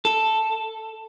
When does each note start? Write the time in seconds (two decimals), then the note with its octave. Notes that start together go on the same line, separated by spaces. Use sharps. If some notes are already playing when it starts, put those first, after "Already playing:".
0.05 A4